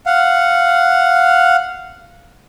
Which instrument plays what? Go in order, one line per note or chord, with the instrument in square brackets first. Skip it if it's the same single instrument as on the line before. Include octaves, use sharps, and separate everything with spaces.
[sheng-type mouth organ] F5 F#5